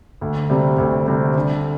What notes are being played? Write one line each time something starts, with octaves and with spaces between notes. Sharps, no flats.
D2
C3 G3 C4
D2
C3 G3 C4
D3